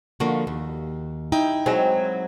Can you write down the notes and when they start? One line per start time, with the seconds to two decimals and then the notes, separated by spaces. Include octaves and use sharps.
0.20 D3 F3 A#3 F#4
0.47 D#2
1.32 D#4 E4 G5
1.66 F#3 G#3 C4